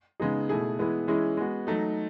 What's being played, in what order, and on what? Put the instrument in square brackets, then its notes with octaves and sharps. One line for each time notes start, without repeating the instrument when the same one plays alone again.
[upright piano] C#3 G#3 B3 D#4 G#4
B2 A3 E4 G#4
E3 G#3 B3 E4 G#4
E3 G#3 C#4 E4 G#4
G#3 B3 F#4
F#3 A3 D#4